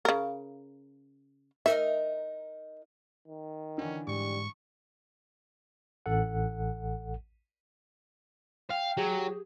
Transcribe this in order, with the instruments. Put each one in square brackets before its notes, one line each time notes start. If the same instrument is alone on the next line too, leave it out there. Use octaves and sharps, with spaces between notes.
[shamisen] C#3 A#4
[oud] D#4 A#4 D#5 [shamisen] E5
[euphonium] D#3
[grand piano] D3 E3 [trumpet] C#4
[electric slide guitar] G#2 [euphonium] G3 [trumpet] C#6
[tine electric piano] A1 A4 F#5
[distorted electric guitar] F5 [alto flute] G5
[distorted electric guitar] F#3 [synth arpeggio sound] G4 G#4